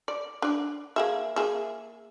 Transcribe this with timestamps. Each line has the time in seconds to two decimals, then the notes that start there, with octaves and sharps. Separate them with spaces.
0.08 D5
0.42 D4 D5
0.96 A#3 G#4 E5
1.36 A#3 G#4 E5